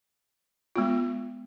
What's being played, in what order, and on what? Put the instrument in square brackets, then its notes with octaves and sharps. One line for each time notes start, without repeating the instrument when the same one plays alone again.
[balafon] G#3 B3 F4